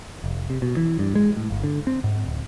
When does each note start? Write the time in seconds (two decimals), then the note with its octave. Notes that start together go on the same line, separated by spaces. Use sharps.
0.24 F1
0.50 C3
0.62 B2
0.77 E3
0.99 G2
1.15 G#3
1.37 A2
1.51 G1
1.64 D3
1.87 C4
2.04 G#2
2.26 D1